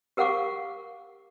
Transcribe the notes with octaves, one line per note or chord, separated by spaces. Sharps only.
G4 A#4 F5 F#5 C#6 D6